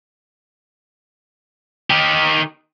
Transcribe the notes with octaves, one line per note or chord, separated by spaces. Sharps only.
D#3 G4